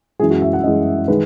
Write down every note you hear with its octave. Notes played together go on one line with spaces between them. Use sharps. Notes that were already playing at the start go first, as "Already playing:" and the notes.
F#2 E3 G#3 G#4
F#4
E5
F#5
F#2 E3 G#3 D#5
D#3 G#3 B4